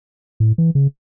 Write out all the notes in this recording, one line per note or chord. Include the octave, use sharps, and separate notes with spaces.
A2
E3
C#3